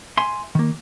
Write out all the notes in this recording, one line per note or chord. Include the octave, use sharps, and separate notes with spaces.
E5 G#5 C6
D#3 A#3